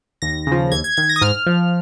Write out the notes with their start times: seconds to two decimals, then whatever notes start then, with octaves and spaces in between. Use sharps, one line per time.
0.22 D#2 A#6
0.47 C#3 F3
0.72 D#2 G#6
0.84 G#6
0.97 D#3 G#6
1.09 A#6
1.16 D#6
1.21 G#2 F6
1.46 F3